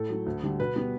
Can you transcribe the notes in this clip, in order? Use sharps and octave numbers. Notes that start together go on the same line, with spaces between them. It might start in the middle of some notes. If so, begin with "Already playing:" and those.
Already playing: A2 A4
F#3 A3
D2
D3 G3
B2 B4
G3 B3